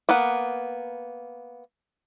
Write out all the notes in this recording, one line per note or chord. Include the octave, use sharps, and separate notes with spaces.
A#3 B3 B4 F#5